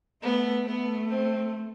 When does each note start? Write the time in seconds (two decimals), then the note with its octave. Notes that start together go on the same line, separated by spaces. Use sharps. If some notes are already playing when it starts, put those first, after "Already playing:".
0.22 A3 B3
0.65 A3 B3
1.08 C4